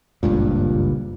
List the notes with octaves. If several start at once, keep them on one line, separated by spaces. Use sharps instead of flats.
F#1 C#2 G2 A#2